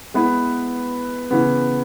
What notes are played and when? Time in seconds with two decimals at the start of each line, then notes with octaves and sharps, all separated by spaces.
0.14 G#3 B3 E4 B4
1.31 C#3 E3 B3